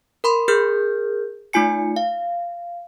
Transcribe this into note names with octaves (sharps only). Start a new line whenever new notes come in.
A#4 B5 C6
G#4 A#4 F6 G6
A3 D#4 F4 G#5 C#7
F5